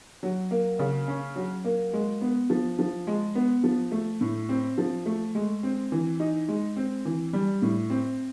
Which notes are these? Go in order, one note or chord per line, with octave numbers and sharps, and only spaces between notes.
F#3
A#3
C#3
C#4
F#3
A#3
G#3
B3
F3
F3
G#3
B3
F3
A3
A2
C4
F3
A3
G#3
C4
E3
D#4
G#3
C4
E3
G3
A2
C4